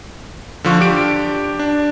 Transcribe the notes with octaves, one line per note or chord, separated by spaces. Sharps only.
D3 F3 C#6
D4 G4 D7
D4